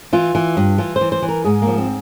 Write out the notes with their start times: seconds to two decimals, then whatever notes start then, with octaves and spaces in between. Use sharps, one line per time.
0.13 E3 F4
0.35 E3
0.57 G2
0.78 E3 F4
0.96 C5
1.01 E3
1.12 C5
1.22 E3
1.28 A#4
1.44 G#2 G#4
1.62 A#3
1.67 F3
1.78 C4